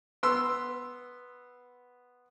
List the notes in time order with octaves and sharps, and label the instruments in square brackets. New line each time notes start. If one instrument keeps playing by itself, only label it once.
[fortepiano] B3 C6 E6